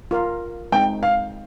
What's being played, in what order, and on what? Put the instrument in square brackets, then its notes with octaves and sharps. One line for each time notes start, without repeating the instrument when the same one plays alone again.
[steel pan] F4 A#4 F5
[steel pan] G#3 C4 D#4 [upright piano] G5
[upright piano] F5